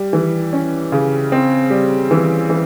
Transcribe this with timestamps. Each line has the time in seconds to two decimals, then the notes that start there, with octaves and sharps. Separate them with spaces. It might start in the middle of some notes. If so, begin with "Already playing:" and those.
Already playing: G3
0.13 E3
0.53 C#4
0.92 C#3
1.32 C4
1.70 G3
2.11 E3
2.50 E3